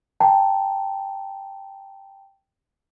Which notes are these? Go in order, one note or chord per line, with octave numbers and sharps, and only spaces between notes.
G5 A5 A#5